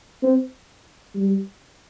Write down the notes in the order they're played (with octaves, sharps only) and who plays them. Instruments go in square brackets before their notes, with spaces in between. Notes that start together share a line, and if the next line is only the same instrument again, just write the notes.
[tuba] C4
G3